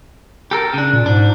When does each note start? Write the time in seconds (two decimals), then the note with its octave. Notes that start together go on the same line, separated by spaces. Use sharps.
0.51 G4 A4 A#4
0.74 C#3 D4
0.93 A#2
1.06 G#2 D4